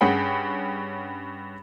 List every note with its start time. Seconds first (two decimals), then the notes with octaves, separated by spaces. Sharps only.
0.01 G2 C#4 G#4 F#5 G5 B5